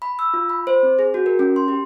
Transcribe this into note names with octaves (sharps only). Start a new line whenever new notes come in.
B5
E6
F4
B5
C5
C4
G#4
F#4
A#4
C#4
C6
G4